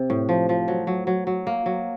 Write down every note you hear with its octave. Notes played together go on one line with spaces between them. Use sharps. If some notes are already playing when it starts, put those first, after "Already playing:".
Already playing: C3
A2
F3
F3
F#3
F#3
F#3
F#3
A#3
F#3